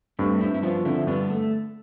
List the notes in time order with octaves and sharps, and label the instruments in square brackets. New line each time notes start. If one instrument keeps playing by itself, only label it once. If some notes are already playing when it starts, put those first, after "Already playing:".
[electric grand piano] G2 [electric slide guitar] A3 C4
[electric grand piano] G2 [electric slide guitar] C4 E4
[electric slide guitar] E4
[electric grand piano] F3 [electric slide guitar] B3 D4
[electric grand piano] D3 [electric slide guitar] C4 E4
[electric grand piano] G2 [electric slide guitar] B3 D4
[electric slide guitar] A3